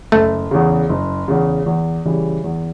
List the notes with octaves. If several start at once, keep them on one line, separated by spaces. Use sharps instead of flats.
F#1 A3
E2 C#3
F#1
E2 C#3
E2
C#3 E3 G3
E2